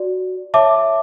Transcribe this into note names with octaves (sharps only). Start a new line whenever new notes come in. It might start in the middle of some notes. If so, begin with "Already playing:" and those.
Already playing: F#4 D5
C#5 E5 A5 D6